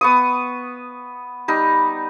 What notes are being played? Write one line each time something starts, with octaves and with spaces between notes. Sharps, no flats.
B3 C#6 D#6
G3 D#4